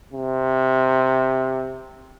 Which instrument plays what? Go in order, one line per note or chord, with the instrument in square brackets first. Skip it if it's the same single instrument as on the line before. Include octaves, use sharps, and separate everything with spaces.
[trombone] C3